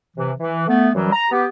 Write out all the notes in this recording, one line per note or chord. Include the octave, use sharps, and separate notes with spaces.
C3 E3
E3
A3 B3
F#2 E3 F#3 G3
A#5
B3 G4